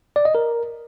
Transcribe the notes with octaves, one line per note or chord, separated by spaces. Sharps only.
D5
D#5
A#4